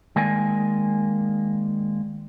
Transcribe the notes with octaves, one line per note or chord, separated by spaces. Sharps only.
D#3 G#3 A#3 D5 G#5